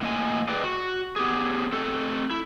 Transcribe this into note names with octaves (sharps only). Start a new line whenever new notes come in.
A2 A#3 D#5 G#5
G#4 B4 D5 D#5 G5
F#4
B3 G4 G#4
A3 C4 A4
E4